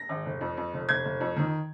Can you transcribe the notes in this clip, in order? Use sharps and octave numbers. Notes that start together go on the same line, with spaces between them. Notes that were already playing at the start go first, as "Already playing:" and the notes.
Already playing: A#6
G#1
F1
F2
F2
F1
F1 G#6
F1
F2
D#3